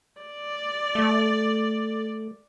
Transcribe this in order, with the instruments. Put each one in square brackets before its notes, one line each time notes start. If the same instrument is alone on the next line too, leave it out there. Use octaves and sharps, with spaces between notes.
[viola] D5
[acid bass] A3